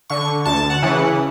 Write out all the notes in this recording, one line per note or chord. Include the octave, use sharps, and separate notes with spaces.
D3 C#6
D2 A5
F#5
C#3 E3